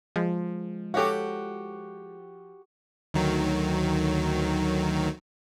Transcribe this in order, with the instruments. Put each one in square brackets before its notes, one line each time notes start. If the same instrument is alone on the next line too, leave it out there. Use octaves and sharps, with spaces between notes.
[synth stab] F3 [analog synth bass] G#3
[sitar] F#4 G4 [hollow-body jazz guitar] A4 C#5 F5
[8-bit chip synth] D2 D#3 F#3